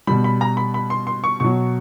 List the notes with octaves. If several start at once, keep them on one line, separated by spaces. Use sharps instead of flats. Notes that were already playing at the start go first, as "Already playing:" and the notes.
B2 G3 B5
B5
A#5
B5
B5
C6
C6
C#6
B2 F#3 C#6